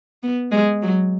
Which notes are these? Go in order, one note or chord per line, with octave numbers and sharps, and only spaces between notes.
B3
G#3
F#3